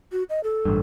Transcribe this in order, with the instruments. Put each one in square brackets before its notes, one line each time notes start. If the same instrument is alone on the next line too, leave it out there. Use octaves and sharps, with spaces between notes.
[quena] F#4
D#5
A4
[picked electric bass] A1 G2